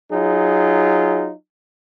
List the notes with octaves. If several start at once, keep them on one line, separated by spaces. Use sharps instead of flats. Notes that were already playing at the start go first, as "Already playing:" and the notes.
F#3 D#4 F4 G#4